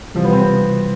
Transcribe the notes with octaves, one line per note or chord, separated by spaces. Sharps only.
C3 E3 F3 G3
B3
C4